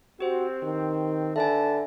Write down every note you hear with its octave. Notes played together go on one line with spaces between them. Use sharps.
C4 F#4 G4 C5
D#3
D3 B4 E5 G#5 A5